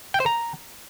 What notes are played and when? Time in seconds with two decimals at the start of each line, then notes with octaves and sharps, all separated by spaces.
0.14 G5
0.20 C5
0.26 A#5